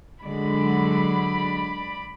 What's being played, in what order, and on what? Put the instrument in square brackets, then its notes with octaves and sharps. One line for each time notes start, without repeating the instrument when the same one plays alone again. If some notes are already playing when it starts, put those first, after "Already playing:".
[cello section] D3 F#3 G#3 [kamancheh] D5 B5